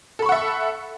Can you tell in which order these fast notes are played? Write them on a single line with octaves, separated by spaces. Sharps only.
A4 B5 C#6 F#5 E5